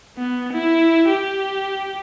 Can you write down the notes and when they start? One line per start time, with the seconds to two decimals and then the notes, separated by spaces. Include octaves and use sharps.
0.18 B3
0.53 E4
1.08 G4